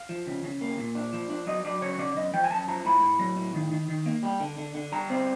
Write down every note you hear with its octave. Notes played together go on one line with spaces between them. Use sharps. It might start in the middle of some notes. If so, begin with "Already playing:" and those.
Already playing: F5
F3
C#3
C#3
A#3
A#2
D4
F3
D4
F#3 D#5
F#3 D5
C#3 C#5
C#5
C#3 D5
F#2 D#5
F3 G5
G#5
F#2 A5
F3 A#5
A2 B5
A2
F#3
A2
D#3
D#3
D#3
A#3
G3
D3
D3
D3
G3 A#5
C4